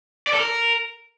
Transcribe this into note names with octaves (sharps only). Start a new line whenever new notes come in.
D5
A4
A#4